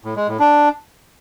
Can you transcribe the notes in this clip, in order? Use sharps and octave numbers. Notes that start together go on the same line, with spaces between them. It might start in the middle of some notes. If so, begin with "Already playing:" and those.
A2
G#3
A2
D4